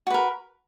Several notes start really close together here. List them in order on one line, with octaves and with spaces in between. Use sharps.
F#4 B4 A#4